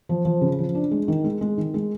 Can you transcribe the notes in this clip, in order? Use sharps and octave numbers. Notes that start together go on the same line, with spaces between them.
F3
F3
C#3
F3
D4
G#3
D#3
G#3
G#3
D#3
G#3